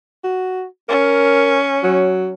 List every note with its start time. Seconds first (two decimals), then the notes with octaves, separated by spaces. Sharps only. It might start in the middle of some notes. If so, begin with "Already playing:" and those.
0.24 F#4
0.89 C#4 A#4
1.84 F#3